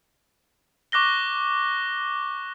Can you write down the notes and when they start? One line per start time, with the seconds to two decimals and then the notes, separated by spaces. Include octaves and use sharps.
0.92 C#6 D6 F#6 A#6 G7